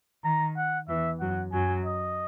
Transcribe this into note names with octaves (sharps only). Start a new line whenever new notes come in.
D#3 A#5
F#5
E2 E3 E5
F#2 F#3 F#5
F#2 F#3 G#5
D#5